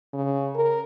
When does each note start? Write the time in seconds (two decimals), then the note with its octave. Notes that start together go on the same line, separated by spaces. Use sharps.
0.14 C#3
0.55 A#4